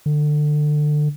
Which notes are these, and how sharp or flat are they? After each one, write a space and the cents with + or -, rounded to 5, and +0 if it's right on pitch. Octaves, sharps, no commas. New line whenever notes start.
D3 +25